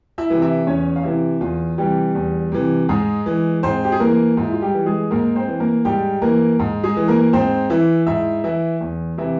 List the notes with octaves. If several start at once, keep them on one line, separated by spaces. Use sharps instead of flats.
E4 E5
C3 E3
E4 E5
E2 C#4 C#5
F5
C3 E3 E4 E5
E2 F4
C3 E3 G3 G4
E2
C3 E3
G#2 G#3 G#4
E3
G#2 C4 C5
G4
G#4
E3 A#3 A#4
G#2
E4
F4
G3 G4
E3
G#3 G#4
G#2 A#3 A#4
C4 C5
E3
A#3 A#4
G#2 G3 G4
E3 A#3 A#4
G#2
G#3 G#4
E3
A#3 A#4
G#2 C4 C5
E3 E4 E5
G#2 E4 E5
E3 E4 E5
E2
C3 E3 E4 E5